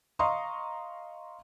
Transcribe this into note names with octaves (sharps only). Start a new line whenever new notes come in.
D#5 F5 A#5 C6 C#6 D#6